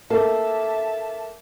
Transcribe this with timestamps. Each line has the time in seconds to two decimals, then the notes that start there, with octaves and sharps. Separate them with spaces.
0.10 A#3 A4 E5 A5